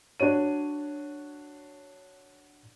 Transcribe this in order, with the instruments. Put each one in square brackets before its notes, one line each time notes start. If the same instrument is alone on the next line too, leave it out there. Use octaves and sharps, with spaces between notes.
[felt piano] D4 F#4 C#5 D#7